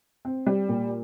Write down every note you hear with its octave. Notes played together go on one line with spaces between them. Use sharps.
C4
G3
A#2